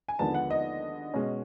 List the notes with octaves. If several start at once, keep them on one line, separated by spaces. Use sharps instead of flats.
G#5
D#2 D3 F3 G#3 B3 A5
F#5
D#5
B2 G#3 C#4